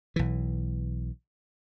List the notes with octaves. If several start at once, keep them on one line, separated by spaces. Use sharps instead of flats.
B1 E3